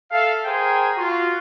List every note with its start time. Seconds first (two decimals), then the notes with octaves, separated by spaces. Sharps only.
0.12 A4 E5 F5
0.46 G#4 A#4 C5 G5 G#5
0.97 F4 F#4